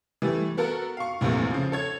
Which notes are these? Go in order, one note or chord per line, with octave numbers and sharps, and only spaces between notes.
E3 G3 A3
B3 F#4 A4 A#4
F5 C#6
A#1 E2 C3 A3 A#3
C#3 F3
A4 C#5 G#6